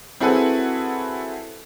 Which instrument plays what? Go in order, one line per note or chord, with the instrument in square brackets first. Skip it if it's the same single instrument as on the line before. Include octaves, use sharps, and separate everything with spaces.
[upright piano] C4 E4 F#4 G#4 A4 B4